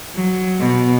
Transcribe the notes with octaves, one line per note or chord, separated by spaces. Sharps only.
F#3
B2